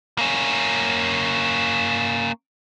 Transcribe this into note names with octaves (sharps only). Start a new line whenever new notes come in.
A#3 C#4